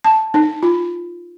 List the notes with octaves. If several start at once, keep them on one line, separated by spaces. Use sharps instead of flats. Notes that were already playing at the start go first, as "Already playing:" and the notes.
A5
D#4
F4